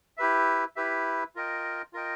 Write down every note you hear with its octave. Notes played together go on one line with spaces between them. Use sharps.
E4 G4 B4 E5
E4 G4 B4 E5
F4 A#4 D#5 G5
F4 A#4 D#5 G5